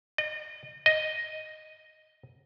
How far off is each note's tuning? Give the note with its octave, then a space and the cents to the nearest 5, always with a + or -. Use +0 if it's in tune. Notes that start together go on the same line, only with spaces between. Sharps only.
D#5 -35
D#5 +0